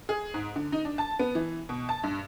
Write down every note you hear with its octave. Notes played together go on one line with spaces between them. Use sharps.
G#4
G#2
D3
D#4
D4
A5
B3
E3
B2
A5
G2